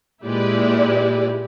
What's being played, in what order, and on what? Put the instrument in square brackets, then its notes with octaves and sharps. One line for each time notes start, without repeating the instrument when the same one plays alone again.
[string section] A#2 G#3 E4 G4 B4 D5